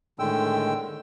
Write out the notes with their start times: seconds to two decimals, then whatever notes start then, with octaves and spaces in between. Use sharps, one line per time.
0.19 A2 D3 D#3 G#3 G5 E6